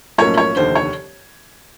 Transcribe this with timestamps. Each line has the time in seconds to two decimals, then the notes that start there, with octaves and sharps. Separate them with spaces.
0.18 B1 A2 F3 A#3 C#4 C#5
0.37 C#5
0.56 F1 D#2 D3 C5
0.75 C#5